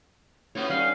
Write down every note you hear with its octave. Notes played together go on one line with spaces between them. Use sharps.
A2 C#4 F4 F#4 B4 C#5
D3 G3 C#4 D#4 F5 B5